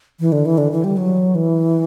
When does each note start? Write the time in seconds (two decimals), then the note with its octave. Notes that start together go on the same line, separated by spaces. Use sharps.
0.20 E3
0.32 D3
0.46 E3
0.58 D3
0.72 E3
0.84 G3
0.97 F#3
1.35 E3